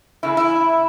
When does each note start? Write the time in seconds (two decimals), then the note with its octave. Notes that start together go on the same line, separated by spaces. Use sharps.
0.23 E2 C#3 E4
0.37 E4